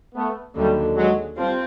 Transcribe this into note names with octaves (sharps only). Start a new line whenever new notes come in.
A3 B3
D#2 D3 F#3 G3 A3
F#3 G#3
F3 G3 C4 F4